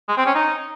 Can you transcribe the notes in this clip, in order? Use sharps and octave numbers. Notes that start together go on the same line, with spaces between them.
G#3
C4
C#4
D#4